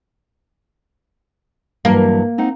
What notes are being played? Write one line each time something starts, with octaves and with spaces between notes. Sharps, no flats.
G2 E3 F#3 A#3
C4 D#4 F#5